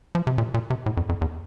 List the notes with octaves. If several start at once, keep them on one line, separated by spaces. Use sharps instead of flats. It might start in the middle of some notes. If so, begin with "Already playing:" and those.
F3
C3
A#2
A#2
C3
A2
F2
F2
E2